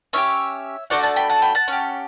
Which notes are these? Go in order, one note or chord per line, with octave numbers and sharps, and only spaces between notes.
C#4 E4 G4 C#5 E5
A3 D4 F#4 D5 F#5
F#5 A5
G5 B5
F#5 A5
G5 B5
F#5 A5
C#4 G4